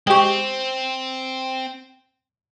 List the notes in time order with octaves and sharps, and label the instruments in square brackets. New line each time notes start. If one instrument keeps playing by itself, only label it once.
[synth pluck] G#3 G4 [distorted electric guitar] C4 [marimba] G5 C#6